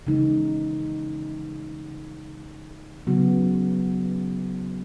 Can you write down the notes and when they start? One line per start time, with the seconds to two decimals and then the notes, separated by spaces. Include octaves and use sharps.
0.07 C#3 E3 G#3 D#4
3.07 C#3 F#3 B3 F#4